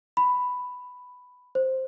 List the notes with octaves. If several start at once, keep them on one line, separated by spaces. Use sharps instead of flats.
B5
C5